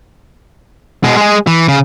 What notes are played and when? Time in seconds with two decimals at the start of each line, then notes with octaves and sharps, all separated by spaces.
1.04 B2 G#3
1.17 G#3 G#4
1.47 E3
1.68 C#3